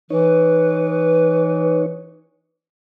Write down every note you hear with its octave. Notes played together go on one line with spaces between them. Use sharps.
E3 D#4 B4 C#5